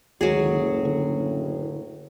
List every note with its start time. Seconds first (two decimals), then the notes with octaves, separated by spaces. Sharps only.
0.21 F#1 D2 A2 D#3 F#3 G#3 G#4
0.85 D3